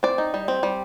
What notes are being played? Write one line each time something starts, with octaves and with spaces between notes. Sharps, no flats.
C4 D5
D#4
G3
C4
G3